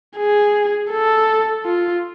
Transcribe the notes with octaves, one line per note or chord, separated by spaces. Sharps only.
G#4
A4
F4